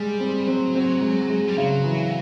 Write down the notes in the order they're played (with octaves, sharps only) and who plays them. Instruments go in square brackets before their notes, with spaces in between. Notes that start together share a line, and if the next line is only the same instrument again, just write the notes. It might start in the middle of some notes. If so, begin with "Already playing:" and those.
Already playing: [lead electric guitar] G3 [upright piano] G#3
[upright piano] C4
[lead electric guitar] F#3 [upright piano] C4
[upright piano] C4
G#3
G#3
[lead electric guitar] G3
[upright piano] C#3 [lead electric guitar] F#3
[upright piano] E3